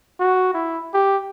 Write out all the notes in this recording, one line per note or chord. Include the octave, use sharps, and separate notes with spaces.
F#4
E4
G4